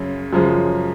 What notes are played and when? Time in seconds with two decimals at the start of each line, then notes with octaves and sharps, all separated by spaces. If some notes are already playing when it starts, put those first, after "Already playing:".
Already playing: F#2 C#3
0.33 F#2 C#3 F3 G#3